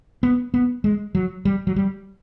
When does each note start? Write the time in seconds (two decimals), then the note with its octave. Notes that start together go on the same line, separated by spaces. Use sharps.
0.23 B3
0.54 B3
0.84 G#3
1.15 F#3
1.45 G3
1.67 F#3
1.76 G3